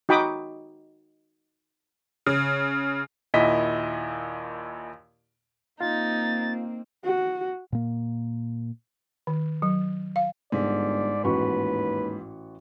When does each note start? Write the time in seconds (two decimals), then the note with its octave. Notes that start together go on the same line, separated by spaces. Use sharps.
0.09 D#4 F#4 G5 B5 D6 D#6
2.26 C#3
3.34 D#2 A#2 E4 D#5 B6
5.80 A#3 C4 D#4 F4 F5 A6
7.05 F#4
7.72 A#2 A#3
9.27 D#3
9.62 F#3
10.16 F5
10.52 G1 G#2 D5
11.24 A1 D#2 F#4 B4 C#6